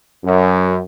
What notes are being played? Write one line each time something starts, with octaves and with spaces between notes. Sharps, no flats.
F#2